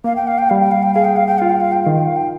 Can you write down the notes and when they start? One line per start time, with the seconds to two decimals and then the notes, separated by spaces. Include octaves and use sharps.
0.04 A#3 F5
0.16 G5
0.27 F5
0.38 G5
0.49 G3 F5
0.60 G5
0.72 F5
0.83 G5
0.94 G#4 F5
1.05 G5
1.16 F5
1.27 G5
1.39 F4 F5
1.50 G5
1.60 F5
1.72 G5
1.82 D#3 F5
1.94 G5
2.05 F5
2.16 G5